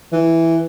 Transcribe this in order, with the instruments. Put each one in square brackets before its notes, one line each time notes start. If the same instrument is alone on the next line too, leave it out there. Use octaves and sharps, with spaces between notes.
[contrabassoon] E3